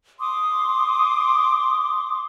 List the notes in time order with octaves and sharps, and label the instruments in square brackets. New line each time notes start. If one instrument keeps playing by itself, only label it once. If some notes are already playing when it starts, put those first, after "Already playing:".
[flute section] C6 D6 D#6